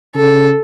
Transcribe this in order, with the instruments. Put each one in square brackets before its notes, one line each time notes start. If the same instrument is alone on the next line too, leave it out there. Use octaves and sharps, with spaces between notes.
[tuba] C#3 [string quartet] A4